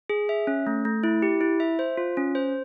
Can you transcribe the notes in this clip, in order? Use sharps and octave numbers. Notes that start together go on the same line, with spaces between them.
G#4
E5
C#4
A3
A3
E4
G4
E4
E5
C5
F4
C#4
C5